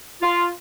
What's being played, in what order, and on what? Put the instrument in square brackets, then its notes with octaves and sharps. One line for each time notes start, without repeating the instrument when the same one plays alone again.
[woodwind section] F4